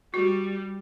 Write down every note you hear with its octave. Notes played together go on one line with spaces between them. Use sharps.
G3 F#4